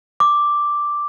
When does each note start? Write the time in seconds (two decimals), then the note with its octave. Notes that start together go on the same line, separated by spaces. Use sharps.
0.20 D6